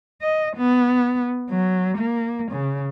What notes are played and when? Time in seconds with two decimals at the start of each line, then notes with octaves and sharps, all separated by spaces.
0.22 D#5
0.56 B3
1.50 F#3
1.98 A#3
2.51 C#3